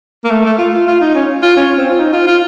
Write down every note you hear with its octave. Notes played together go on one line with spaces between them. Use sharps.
A#3
A3
A3
F4
F4
F4
D#4
C#4
F4
C#4
C4
F4
D#4
F4
F4